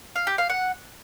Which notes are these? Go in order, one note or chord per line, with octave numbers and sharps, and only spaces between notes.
F5
G4
F5
F#5